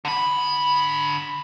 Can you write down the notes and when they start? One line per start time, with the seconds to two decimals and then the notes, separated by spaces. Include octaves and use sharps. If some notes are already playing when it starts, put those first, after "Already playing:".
0.05 D3 B5